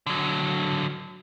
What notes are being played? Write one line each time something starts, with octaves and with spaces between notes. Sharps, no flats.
D3 F#3